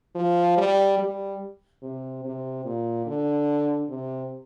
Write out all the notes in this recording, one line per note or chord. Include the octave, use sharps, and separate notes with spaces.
F3
G3
G3
C3
C3
A#2
D3
C3